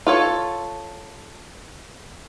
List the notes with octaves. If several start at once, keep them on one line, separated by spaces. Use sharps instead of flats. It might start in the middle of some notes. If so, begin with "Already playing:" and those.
F4 A4 C#5